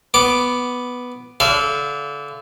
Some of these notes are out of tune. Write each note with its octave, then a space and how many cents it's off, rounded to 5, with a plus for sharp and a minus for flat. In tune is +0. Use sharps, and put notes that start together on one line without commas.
B3 +0 D6 +0
D3 -30 F5 -45